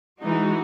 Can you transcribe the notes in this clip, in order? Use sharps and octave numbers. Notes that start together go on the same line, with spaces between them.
E3 G#3 D#4 F#4